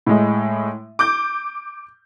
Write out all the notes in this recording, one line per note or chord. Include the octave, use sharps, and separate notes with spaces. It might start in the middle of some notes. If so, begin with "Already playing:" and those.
A2 G#3
D6 G6